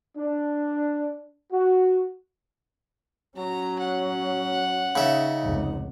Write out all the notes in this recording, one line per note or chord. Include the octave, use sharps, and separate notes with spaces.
D4
F#4
F#3 C#4 A#5
F#5
C#3 D#4 E5
F1 C#2